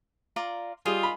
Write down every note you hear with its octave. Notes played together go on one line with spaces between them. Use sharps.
F4 D5 A#5
G3 F4 G#4 D#5
B5